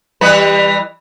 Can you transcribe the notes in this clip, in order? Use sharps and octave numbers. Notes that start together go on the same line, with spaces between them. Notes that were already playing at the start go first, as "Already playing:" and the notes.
E3 G3 B4